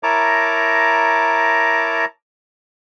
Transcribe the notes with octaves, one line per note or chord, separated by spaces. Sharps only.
E4 A#4 C#5 A5 A#5 D6